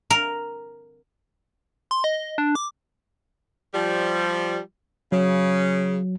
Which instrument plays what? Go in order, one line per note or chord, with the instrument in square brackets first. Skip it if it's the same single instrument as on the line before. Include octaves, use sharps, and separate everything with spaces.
[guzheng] A#4
[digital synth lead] C6
D#5
D4
D6
[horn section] F3 G3
[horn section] C#3 [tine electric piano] F#3